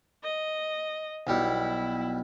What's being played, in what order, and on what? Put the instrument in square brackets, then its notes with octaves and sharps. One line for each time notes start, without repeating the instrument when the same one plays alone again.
[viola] D#5
[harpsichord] B1 G3 [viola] E4